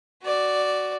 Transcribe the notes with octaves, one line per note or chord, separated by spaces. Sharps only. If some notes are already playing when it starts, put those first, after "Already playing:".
F#4 D5